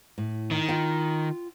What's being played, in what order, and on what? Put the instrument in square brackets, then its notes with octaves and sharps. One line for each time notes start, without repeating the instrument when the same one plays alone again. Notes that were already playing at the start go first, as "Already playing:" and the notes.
[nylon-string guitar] A2
[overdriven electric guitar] D#3
[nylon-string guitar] F4 G5